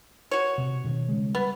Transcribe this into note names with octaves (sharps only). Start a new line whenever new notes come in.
F#4 C#5
C3
B2 D#3
C#3 G3 G#3
G3 B3